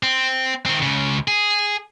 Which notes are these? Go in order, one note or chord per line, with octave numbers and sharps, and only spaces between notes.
C4
D#3 C4
C#2 C#3
G#4